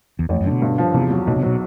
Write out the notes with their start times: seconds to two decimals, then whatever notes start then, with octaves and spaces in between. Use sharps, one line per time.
0.19 E2
0.29 A1 F2
0.41 F#2
0.45 D3
0.51 B2
0.62 G2
0.78 F3
0.94 E2 C3
1.11 F#3
1.27 B1 B2
1.36 C3
1.43 B2 F#3